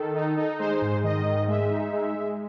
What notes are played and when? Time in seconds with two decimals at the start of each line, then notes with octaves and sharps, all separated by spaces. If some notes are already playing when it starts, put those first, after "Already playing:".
Already playing: D#3 A4
0.14 D#4
0.37 D#4
0.59 G#3 C5
0.82 G#2
1.04 D#3 D#5
1.26 G#2
1.48 G#3 E5
1.70 D#4
1.93 G#3
2.15 G#3